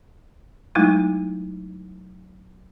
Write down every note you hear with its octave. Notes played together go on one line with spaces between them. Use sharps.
F#3 G#3 A3 D#4 E4